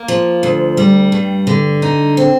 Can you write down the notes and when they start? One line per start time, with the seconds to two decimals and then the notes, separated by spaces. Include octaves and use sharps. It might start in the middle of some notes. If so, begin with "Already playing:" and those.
Already playing: A#3
0.08 F3
0.43 D2
0.77 G3
1.12 G2
1.47 D3
1.82 D#4
2.17 C4